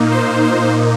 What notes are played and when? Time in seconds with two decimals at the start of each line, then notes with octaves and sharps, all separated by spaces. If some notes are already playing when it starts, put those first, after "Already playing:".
Already playing: A#2 A#3 D#4
0.12 C5
0.43 C5